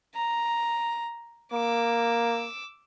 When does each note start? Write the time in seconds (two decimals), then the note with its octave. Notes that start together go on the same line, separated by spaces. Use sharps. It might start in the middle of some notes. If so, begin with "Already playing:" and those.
0.14 A#5
1.53 A#3 D6 E6